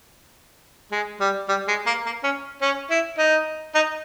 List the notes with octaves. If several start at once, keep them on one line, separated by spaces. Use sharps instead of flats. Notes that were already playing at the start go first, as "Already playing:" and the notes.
G#3
G3
G3
G#3
A#3
A#3
C#4
C#4
E4
D#4
D#4